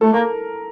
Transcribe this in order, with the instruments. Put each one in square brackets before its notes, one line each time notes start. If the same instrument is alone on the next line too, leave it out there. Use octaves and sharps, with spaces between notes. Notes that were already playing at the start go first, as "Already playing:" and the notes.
[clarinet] A3 [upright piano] A4
[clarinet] A#3 [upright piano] A#4